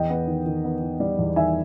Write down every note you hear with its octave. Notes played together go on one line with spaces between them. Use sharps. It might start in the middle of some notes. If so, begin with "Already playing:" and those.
Already playing: E2 D#5 G5
B3
D#3
D#3
B3
D#3
G3
E2
D#3 E5 G#5